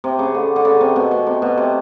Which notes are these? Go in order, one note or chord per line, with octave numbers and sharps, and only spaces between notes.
C3
C#3
D3
D3
C#3
C3
B2
B2
C3
B2
C3